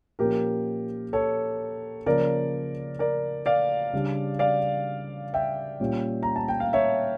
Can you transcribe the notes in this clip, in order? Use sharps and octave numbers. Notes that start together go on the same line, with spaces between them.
A#2 F3 A#3 C#4 G4 A#4
A4 C#5
C#3 F3 A#3 C#4 A#4 D5
A#4 D5
D5 F5
C#3 G3 D4
D5 F5
E5 G5
A#2 G3 C#4
A#5
A5
G5
F5
C#5 E5